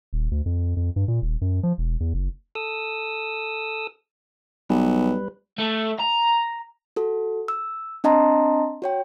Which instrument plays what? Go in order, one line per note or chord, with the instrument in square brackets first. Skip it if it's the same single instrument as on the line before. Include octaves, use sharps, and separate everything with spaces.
[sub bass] D#1
D2
F2
F2
G2
A#2
D#1
F#2
F3
E1
E2
F#1
[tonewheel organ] A4 D#6 E6
[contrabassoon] B1 [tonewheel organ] G3 B4
[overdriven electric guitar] A3
A#5
[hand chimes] F#4 A4
E6
C4 D4 D#5 A5 A#5 C6
F#4 C#5 G5